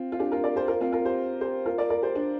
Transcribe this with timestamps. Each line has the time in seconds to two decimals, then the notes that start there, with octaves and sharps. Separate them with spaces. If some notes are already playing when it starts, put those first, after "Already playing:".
Already playing: C4 F4
0.12 F4
0.19 D4 G4
0.32 F4 A#4
0.44 A#4 D5
0.56 G4 C5
0.68 F4 A#4
0.81 C4 F4
0.92 F4 A#4
1.05 G4 C5
1.41 G4 C5
1.66 F4 A#4
1.78 A#4 D5
1.90 A#4 D5
2.03 G4 C5
2.15 D4 G4